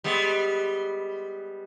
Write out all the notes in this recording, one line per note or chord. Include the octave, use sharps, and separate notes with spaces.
G3 G#3 B3